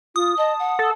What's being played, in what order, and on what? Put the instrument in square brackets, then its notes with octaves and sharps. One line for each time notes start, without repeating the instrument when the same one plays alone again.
[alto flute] F4 [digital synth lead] D#6
[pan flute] D#5 [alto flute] A5
[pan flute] F#5
[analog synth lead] A4